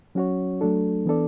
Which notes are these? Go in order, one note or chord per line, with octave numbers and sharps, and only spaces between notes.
F#3 C#4 F#4 C#5
F#3 A3 D4 A4
E3 B3 D4 A4 D5